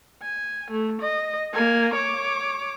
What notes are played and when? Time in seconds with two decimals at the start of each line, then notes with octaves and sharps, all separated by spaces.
0.22 G#5
0.71 A3
1.02 D#5
1.54 A#3 G#5
1.94 C#5 D6